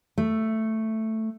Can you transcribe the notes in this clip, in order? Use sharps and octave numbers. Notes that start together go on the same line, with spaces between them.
A3